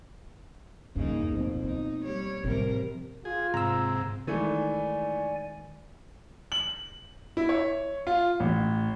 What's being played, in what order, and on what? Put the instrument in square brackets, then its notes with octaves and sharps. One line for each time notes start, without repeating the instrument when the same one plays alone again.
[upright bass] E2 G2 [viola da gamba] C#3 A#3 D#4
[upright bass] D1 [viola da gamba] F2 B2
[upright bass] A#3 [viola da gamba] D#4
[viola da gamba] G3 C#5
[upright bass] A2 F3 [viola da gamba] C3 G3 A#4
[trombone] F4 [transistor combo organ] G#4
[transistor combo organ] G#2 C3 [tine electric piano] A#5 E6
[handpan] D#3 G#3 [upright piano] E3 A3 [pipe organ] D5 G#5
[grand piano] F#7
E4
C#5
F4
A1